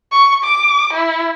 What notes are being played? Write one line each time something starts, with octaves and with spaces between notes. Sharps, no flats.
C#6
D6
E4